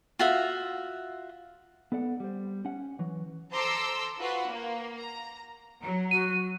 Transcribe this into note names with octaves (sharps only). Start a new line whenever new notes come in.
F4 F#4 E5
B3 A4 D5 F#5
G3 C5
C#4 F#5
E3 F#3
A4 C5 A#5 C6 D6 E6
F4 F#4 B4 F#5
A#3
A#5
F#3 A#5
F#4 D#7